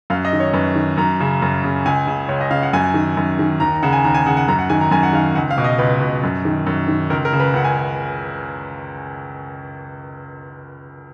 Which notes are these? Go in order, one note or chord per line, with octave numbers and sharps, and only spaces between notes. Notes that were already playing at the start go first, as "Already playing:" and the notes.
F#2 F5
D#5
D#3
C#5
F#2 B4
D#3
F#2 A#5
C#3
F#2
C#3
C#2 G#5
C#3
C#2 C#5
D#5
C#3 F5
F#5
F#2 G#5
D#3
F#2
D#3
D#2 A#5
C#3 F#5
G#5
D#2 A#5
G#5
C#3 F#5
F#5
F#2 A#5
F#5
D#3 G#5
A#5
F#2 G#5
F#5
D#3 F5
C#2 F#5
F5
B2
D#5
C#2 B4
B2
F#2
D#3
F#2
D#3
C#2 A#4
A#4
C#3
B4
C#2 F#5
G#5